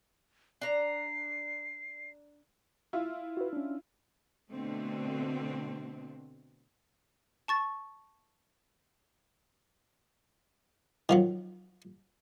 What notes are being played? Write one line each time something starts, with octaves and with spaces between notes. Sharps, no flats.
D4 A#5 C7
E4 F4
F#4 B4
C#4 D4
B2 D3 A3 C4
A5 C#6 A6
D#3 F3 F#3